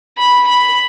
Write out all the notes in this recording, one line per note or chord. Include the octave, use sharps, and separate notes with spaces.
B5
B5